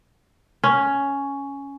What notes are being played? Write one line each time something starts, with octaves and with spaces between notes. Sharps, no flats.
C#4